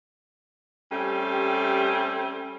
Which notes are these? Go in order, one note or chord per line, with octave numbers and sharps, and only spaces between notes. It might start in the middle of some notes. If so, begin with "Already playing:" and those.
G3 A3 C4 C#4 G4